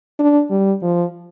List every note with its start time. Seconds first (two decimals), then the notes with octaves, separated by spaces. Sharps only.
0.19 D4
0.51 G3
0.83 F3